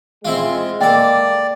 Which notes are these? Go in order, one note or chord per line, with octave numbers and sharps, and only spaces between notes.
G#3 C4 E4 F4
A#3 A4 D5 G5